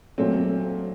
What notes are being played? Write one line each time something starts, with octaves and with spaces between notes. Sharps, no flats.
A#2 F#3 A3 C4